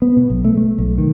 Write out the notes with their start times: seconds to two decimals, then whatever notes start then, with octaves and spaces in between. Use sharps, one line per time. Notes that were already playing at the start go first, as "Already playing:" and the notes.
0.02 B3
0.17 B2
0.30 B1
0.45 A3
0.57 A3
0.78 B1
0.98 D#3